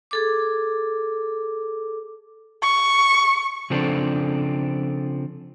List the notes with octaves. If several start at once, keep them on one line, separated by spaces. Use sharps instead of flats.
G#4 A4 D6
C#6
C#3 F3 C4 D4 A4